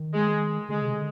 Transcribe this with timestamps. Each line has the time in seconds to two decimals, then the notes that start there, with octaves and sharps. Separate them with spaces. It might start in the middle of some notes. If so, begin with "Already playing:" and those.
Already playing: D#3
0.14 G#3
0.69 D3 G#3
0.82 C3
0.94 D3